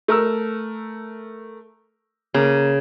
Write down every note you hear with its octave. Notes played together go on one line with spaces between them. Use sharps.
A3 A#4 E6
C#3 A#3